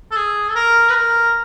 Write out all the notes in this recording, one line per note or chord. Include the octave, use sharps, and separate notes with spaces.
A4
G#4
A4
A#4
B4
A#4